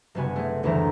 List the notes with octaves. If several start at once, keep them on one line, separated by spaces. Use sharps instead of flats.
F#1 C3 G3 B3 F#4 G#5
A3 C4 G#4
F#1 D2 E3 E4 C5 A#5